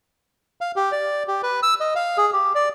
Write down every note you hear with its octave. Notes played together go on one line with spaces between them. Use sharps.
F5
G4
D5
G4
B4
E6
D#5
F5
G#4
G4
D5